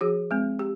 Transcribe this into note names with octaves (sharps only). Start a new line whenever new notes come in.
F3 F#4 G#4
G#3 C4
G4